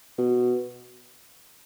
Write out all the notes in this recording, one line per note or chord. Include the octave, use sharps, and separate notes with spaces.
B2